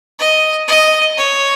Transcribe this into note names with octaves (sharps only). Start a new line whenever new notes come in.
D#5
D#5
C#5